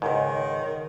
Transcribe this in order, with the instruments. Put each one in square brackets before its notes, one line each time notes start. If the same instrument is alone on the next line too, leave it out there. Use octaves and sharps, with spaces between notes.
[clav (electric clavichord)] C#2 G#2 [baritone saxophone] D#3